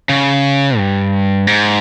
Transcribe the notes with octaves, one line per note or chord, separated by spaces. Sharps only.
C#3
G2
G#2